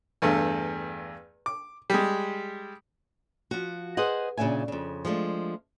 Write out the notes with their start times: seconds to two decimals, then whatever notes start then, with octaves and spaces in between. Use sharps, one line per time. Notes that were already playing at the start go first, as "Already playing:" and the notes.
0.22 E2 G2 A3
1.46 D6
1.90 G3 G#3
3.51 F3 F#4
3.97 G#4 B4 C5 D#5 F#5
4.37 A#2 C#3 A#3 D4 E5 G#5
4.68 F2 C#3
5.05 F3 G#3 A3 D4